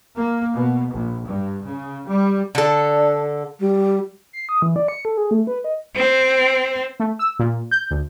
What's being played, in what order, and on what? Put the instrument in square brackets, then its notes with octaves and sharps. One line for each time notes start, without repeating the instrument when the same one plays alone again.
[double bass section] A#3
B2
A#1
G2
C#3
G3
[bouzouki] D3 A4 [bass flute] D4
[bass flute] G3
[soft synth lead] C7
D#6
E3
D5
C#7
A4
G#4
A3
B4
D#5
[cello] C4
[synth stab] A3
E6
A#2
G6
D2